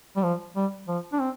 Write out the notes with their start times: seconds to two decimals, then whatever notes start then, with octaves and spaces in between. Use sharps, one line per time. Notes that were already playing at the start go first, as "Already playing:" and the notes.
0.16 G3
0.24 F3
0.56 G3
0.88 F3
1.13 D4
1.20 C4